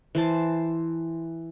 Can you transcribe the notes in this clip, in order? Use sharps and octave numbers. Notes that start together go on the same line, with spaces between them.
E3 C5 A5